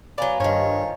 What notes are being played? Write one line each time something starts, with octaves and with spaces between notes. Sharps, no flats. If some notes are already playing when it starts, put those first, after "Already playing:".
F#3 B3 D5 F5 G#5 A#5
G2 D#3 F3 C#5